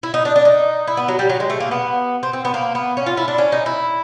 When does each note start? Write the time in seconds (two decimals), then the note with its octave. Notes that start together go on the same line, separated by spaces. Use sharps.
0.03 E4
0.14 D#4
0.25 D4
0.36 D4
0.45 D#4
0.87 E4
0.97 B3
1.08 F#3
1.19 G3
1.30 F#3
1.40 G#3
1.50 A3
1.60 A#3
1.71 B3
2.23 C4
2.33 C4
2.45 B3
2.54 A#3
2.75 B3
2.97 C#4
3.06 F4
3.17 E4
3.28 D4
3.38 C#4
3.52 D#4
3.66 E4